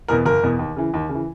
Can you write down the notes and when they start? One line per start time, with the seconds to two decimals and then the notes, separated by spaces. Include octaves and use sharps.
0.08 E2 B2 A#4
0.25 F#1 A#4
0.43 E2 B2
0.59 D#2
0.76 C#3 E3
0.94 D#2
1.09 C#3
1.14 E3